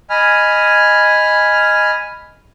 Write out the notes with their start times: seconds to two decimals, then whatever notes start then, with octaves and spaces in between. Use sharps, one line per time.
0.10 D#5 G#5 B5 F6